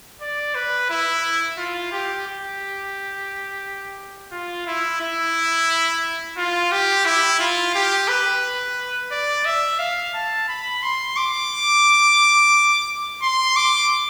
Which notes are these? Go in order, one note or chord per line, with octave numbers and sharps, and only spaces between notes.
D5
B4
E4
F4
G4
G4
F4
E4
E4
F4
G4
E4
F4
G4
B4
D5
E5
F5
A5
B5
C6
D6
C6
D6